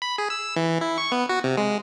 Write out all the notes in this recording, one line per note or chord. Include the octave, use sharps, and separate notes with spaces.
B5
G#4
E6
E3
E4
C#6
B3
F#4
C3
G#3